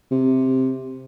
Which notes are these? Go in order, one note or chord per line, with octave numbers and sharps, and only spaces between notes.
C3